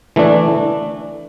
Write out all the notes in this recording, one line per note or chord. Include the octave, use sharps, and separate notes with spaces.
E3 A3 D4